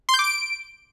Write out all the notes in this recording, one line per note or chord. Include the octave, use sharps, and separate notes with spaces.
C6
G6
D6
D7